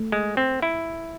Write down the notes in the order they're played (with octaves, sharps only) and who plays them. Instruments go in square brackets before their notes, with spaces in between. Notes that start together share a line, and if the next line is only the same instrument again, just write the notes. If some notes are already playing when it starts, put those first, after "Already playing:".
Already playing: [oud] A3
[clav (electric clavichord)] G#3
C4
E4